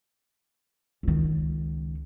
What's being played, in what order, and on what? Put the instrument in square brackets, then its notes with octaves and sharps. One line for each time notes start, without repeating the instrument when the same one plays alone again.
[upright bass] C#2 D#3